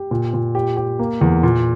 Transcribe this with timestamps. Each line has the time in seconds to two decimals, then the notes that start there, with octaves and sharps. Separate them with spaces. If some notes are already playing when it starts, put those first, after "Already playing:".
Already playing: G4
0.11 A#2
0.34 A#2
0.55 G4
0.77 G4
0.99 A#3
1.21 E2
1.43 A#2